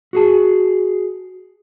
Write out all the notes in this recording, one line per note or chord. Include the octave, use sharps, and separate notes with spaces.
F#4 G#4 A5